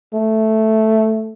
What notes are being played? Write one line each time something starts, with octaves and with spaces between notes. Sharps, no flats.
A3